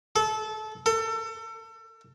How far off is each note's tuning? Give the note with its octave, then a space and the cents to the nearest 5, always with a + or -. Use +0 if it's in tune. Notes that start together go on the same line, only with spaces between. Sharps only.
A4 -25
A4 +30